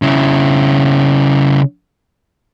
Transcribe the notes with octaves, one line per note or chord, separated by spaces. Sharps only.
C#3 E4